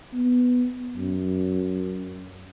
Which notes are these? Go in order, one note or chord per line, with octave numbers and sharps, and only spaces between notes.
B3
F#2